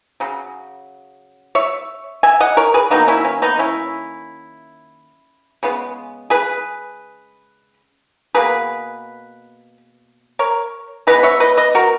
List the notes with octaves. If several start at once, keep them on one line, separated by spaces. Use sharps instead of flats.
C#3 F#3
C#5 E5
E5 G#5
D#5 F#5
A#4 C#5
G#4 B4
D#3 F#3 A#3 B3 D#4
C#4 E4
C#4
B3 D#4
C#4 E4
C#3 G#3 B3
G#4 B4
B2 A#3 G#4 B4
A#4 C#5
E3 G#3 B3 B4 D#5
C#5 E5
B4 D#5
B4 D#5
F#4 A#4